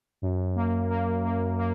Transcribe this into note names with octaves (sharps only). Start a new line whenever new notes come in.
F#2
A#3
A#3
A#3
A#3